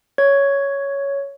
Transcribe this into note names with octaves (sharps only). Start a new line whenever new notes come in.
C#5 G#6